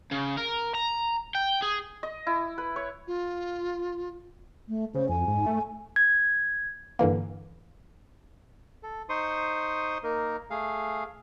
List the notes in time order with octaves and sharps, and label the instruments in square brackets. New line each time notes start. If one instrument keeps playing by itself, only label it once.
[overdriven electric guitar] C#3
A#4
A#5
G5
G#4
[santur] D#5
E4
B4
C#5
[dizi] F4
[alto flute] A3
[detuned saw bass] C#3 [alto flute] C5
[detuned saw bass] F2 [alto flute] G#5
[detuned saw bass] G#2
A3
[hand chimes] G#6
[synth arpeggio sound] G2 D3 E3 A#3
[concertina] A4
D#4 C5 C6 C#6 D#6
A#3 D#4 A#4
A3 G#4 F5